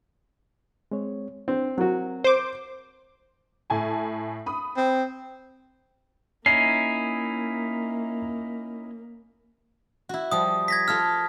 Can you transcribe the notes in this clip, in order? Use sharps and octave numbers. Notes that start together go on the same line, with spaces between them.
G#3 C4 C#5
C4 D4
F#3 C4 F#4 A#4
C5 D6
A2 G#5 A5
B5 D#6
C4
A#3 C#4 D#4 E4 C7
E4 F#4
F3 G3 D#6
G#6 A#6 B6
F4 A4 A#4 F6